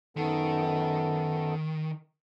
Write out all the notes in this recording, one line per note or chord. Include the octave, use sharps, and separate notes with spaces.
F#2 D#3 B3 A4